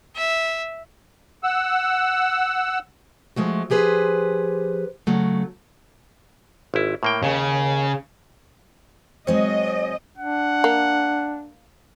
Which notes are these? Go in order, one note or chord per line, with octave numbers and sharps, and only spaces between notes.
E5
F#5 E6
F3 G#3 A3 F#4
F3 G4 G#4 B4 C5
C#3 F#3 A3
G#1 E4
A2 A#3 G5
D#2 C#3
F#3 G#3 C4 C#5 D#5
D4 F#5
A#3